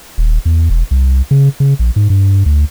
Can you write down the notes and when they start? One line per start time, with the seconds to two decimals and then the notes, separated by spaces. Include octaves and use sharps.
0.18 D#1
0.45 E2
0.70 E1
0.91 C2
1.31 C#3
1.60 C#3
1.79 A#1
1.96 G#2
2.10 G2
2.46 D2